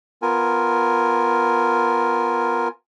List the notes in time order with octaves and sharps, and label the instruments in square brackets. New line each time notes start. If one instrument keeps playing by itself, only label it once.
[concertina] B3 F4 A#4 G#5